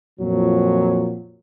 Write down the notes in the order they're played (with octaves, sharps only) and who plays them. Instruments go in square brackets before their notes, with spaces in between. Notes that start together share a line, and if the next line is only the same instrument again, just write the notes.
[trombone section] F2 A#2 F3 F#3